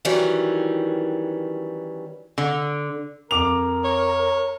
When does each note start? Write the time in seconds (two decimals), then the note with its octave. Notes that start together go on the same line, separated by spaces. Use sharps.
0.05 D#3 E3 F#3 G3 C#4
2.38 D3
3.31 F2 A#4 D6 F7
3.84 C#5